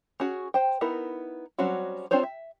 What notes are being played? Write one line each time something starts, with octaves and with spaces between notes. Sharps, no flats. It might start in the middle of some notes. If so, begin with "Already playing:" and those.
C#4 F#4 G#4
C5 G5
B3 D#4 E4 A#4
F#3 G3 C4 C#4 F#4
C4 D4 F4 C5 C#5
E5